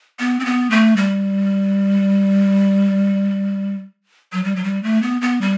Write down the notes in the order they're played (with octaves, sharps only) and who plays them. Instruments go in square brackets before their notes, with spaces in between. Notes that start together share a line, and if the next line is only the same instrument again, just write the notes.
[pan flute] B3
C4
B3
A3
G3
F#3
G3
F#3
G3
A3
B3
B3
G3